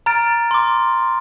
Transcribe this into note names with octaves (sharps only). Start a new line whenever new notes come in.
A#5 F6 A6 D7
C6 D6